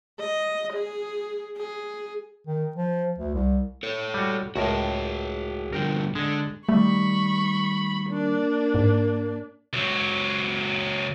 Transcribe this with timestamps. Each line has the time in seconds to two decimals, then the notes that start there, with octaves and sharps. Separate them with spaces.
0.20 D#5
0.73 G#4
1.58 G#4
2.47 D#3
2.76 F3
3.19 D2
3.34 C2
3.83 A4 C#5
4.14 G3 F#4
4.56 C#2 A2 F#4 G#4 A#4
5.72 G2 D3 F3 A#4 G5
6.15 D3 G#3 D5
6.69 D#3 G3 A3 B5 C#6
8.10 A#3 D4
8.75 G#2
9.73 C#2 F#3